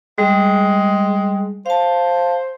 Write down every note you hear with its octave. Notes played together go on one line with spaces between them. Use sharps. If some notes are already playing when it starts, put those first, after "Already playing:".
G3 G#3
C5 F5 A5